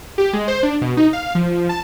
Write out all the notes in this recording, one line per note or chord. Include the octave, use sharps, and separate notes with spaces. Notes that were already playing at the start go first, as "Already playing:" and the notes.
G4
G#3
C5
D4
B2
D#4
F5
F3
A5